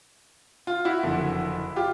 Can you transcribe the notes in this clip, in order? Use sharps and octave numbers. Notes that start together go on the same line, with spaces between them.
F4
E4 F#4
F#1 F2 D3
F4 G4